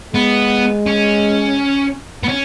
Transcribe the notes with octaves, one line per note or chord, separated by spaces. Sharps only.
G#3 B3
C#4
B3
C#4